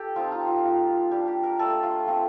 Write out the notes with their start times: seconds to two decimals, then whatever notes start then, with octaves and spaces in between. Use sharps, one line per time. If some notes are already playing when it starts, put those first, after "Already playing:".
Already playing: G4 A4
0.16 F3 C4 D#4 F4
0.32 F4
0.48 F4
0.63 F3 A#3 F4
1.11 G3 D4 F4 G4
1.28 G4
1.43 A#4
1.59 A3 D4 F4 A4
1.83 F4
2.06 F3 A3 C4 F4